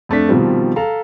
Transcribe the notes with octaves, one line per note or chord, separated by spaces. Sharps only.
F2 A3 D4 B6
B2 D#3 F3 G3 C4
A4 F5 A#5